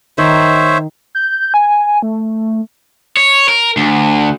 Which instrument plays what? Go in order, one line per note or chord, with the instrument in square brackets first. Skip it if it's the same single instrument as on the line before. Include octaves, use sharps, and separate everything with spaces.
[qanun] D#3 [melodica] C5 C#5 E5
[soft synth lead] G6
G#5
A3
[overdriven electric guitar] C#5
A#4
D2